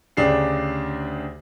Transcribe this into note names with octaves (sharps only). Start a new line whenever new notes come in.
D2 C#3 D4 G4 C7